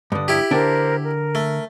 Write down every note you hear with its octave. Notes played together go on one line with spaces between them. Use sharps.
G2 D3 D#6
E4 G4
D3 D4 A#4 C5 G5
A#4
A3